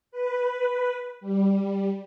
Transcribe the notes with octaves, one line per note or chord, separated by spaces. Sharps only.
B4
G3